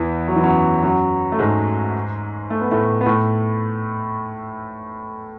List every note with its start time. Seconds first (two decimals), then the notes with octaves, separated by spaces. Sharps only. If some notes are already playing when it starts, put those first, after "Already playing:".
Already playing: E2 E3
0.28 F#3
0.36 E3
0.43 F#2 F#3
0.83 F#2 F#3
1.32 A3
1.39 G#2 G#3
2.50 A3
2.61 B3
2.71 A2 A3
3.01 B3
3.06 A2 A3